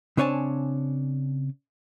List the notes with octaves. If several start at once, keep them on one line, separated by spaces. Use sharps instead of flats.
C#3 C4 D4 C#5 G#5 A5